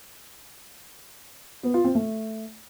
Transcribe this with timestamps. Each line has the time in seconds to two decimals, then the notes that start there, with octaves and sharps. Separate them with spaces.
1.63 B3
1.74 F4
1.84 C4
1.95 A3